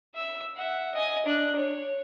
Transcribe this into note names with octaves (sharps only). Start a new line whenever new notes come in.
E5 E6
E5 F#5
D#5 G#5
D4 F#6
C#5